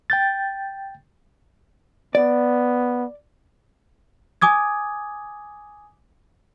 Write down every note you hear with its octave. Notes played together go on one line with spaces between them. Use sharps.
G5 G6 A6
B3 D5
G#5 D6 D#6 G#6